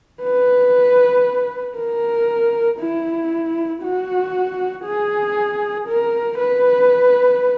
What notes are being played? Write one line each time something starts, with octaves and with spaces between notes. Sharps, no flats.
B4
A#4
E4
F#4
G#4
A#4
B4